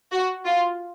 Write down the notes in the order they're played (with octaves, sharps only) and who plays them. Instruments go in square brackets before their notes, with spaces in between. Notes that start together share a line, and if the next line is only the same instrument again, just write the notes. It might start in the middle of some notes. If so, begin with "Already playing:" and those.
[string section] F#4
F4